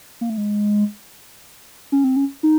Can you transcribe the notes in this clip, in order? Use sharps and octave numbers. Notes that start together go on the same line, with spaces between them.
A#3
A3
G#3
C#4
C4
C#4
D#4